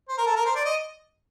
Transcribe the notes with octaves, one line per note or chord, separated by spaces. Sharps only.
C5
A#4
A4
A#4
C5
D5
D#5